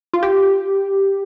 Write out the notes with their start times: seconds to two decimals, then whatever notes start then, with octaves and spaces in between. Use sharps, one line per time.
0.13 F4
0.23 G4